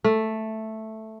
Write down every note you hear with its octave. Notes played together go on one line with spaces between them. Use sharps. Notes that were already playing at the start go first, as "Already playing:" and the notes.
A3